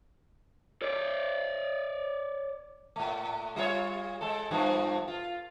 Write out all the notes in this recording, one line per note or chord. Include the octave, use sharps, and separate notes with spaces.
C#5 D5
A2 A3
G3 F4 C#5
G#3 A4
G2 F3 B3
F4